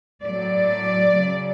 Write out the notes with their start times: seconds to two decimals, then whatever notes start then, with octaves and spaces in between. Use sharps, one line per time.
0.23 A2 F#3 D5
1.12 C#3 F#3